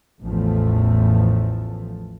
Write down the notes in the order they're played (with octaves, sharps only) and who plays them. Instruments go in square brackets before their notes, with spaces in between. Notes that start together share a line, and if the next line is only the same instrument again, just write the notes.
[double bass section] A1 E2 A2 F3 A3